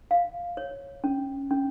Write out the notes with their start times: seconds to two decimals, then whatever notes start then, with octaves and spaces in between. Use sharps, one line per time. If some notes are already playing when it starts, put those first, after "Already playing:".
0.11 F5
0.57 C#5
1.04 C#4
1.51 C#4